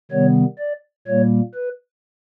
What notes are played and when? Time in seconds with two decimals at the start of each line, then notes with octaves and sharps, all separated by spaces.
0.11 C3 D#3 G3 B3 C#5
0.59 D5
1.07 A#2 G3 A#3 C#5
1.55 B4